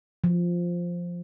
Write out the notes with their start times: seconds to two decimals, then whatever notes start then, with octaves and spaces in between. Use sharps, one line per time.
0.24 F3